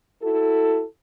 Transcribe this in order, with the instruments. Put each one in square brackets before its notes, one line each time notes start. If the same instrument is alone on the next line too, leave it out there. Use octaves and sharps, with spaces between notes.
[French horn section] E4 F#4 A4